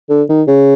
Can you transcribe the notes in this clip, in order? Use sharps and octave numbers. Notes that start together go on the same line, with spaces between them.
D3
D#3
C#3